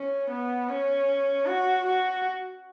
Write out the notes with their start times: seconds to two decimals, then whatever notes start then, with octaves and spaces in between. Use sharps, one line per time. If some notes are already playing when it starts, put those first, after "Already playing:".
Already playing: C#4
0.30 B3
0.69 C#4
1.46 F#4
1.85 F#4